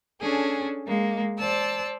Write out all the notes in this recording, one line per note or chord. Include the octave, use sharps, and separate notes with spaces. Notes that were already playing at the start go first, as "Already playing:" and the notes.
C#4 D4 G#4 A4
G#3 A#3
C5 D5 A5 E6